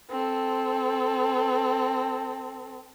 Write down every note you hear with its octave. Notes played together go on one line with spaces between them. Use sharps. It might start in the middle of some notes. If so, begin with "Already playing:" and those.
C4 A4